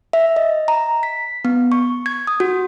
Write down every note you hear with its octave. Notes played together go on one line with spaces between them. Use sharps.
E5
D#5
A#5
B6
B3
C#6
G#6
D#6
F#4